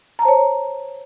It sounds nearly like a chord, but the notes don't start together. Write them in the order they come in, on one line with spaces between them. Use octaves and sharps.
A#5 A5 C5 C#5